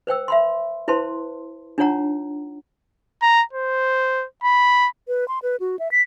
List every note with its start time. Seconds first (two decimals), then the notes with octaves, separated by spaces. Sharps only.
0.07 B4 C5 G5 E6
0.28 E5 B5 C6
0.88 E4 B4 C5 A5 C6
1.78 D4 D#4 F4 C#5 F#5 A#5
3.22 A#5
3.53 C5
4.44 B5
5.08 B4
5.28 C6
5.43 B4
5.60 F#4
5.79 E5
5.91 B6